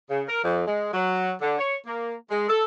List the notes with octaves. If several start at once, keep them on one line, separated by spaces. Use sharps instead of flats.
C#3
A#4
F2
G#3
F#3
D3
C#5
A#3
G#3
A4